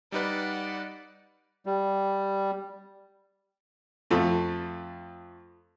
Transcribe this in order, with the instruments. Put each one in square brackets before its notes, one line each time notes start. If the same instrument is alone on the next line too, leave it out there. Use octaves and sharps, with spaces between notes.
[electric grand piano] G3 D#4 B4 [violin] D5 F#5
[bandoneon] G3
[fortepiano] F2 A3